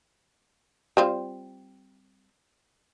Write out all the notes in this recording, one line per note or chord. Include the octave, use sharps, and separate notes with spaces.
G3 C4 F4